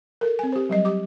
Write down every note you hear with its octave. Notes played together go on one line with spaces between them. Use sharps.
A4 A#4
C4 G#5
G4 C5
F#3 G3 D#5
G4 D6